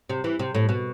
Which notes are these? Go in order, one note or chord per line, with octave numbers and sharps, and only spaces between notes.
C3
E3
C3
A2
B2